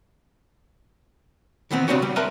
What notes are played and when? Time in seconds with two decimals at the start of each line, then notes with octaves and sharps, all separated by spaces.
1.71 D#3 E3 B3 C4
1.88 C#3 C4 D4 F#4 G4 C#5
2.02 G3
2.16 A#4 B4 E5 A5 A#5 C6